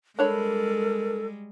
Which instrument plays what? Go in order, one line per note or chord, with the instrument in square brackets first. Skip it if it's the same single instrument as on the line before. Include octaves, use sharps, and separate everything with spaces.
[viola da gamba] G3 G#3 [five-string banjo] D4 C#5 B5 [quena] A4 [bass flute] A#4